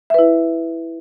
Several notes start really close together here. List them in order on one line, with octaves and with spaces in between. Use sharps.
E5 B4 E4